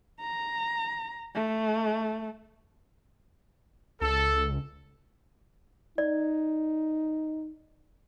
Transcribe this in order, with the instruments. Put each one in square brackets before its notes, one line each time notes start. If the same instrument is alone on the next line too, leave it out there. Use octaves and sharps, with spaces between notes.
[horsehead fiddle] A#5
A3
[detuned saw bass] C#2 [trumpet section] A4
[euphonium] D#4 [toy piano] D5